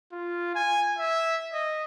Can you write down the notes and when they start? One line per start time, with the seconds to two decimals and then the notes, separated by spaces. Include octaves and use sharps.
0.12 F4
0.56 G#5
0.99 E5
1.54 D#5